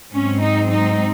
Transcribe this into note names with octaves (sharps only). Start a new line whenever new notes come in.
G#2 F#3 C4 C#4
D#4
D#4